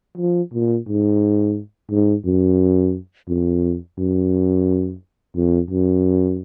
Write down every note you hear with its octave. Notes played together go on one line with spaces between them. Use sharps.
F3
A#2
G#2
G#2
F#2
F2
F#2
F2
F#2